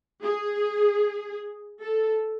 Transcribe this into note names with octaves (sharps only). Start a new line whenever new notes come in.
G#4
A4